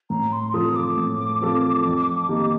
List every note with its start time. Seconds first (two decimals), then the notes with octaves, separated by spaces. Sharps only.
0.10 A2 A#5
0.32 C6
0.54 F3 C4 F4 A4 D#6
0.76 D6
0.97 A2
1.41 F3 C4 F4 A4
1.85 F2
2.28 D#3 A#3 D#4 G4